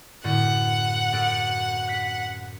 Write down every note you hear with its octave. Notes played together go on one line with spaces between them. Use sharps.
F#2 A2 D3 F#5
F#2 A4 D7
F#6 B6